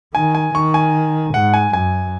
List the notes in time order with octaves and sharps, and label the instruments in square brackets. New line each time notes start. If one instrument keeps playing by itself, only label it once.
[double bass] D#3 [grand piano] G#5
[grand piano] G#5
[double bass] D#3 [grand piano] C#6
[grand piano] G#5
[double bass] G#2 [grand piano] F#5
[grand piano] G#5
[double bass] F#2 [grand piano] G#5